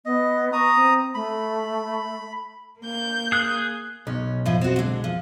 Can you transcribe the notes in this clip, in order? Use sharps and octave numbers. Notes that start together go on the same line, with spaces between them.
B3 D#5
A#5 C#6 D#6
C4
A3 B5
A#3 G6
G#4 F#6
B1 C#4
A2 F3 C5
C4 F#4
D3 G#3
F3